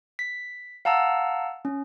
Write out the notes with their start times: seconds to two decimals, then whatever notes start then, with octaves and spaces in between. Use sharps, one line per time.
0.19 B6
0.85 F5 F#5 A5 A#5 E6
1.65 C#4